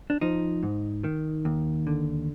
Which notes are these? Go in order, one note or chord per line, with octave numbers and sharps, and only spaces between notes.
D4
F3 D#4
G#2
D#3
D#2
D3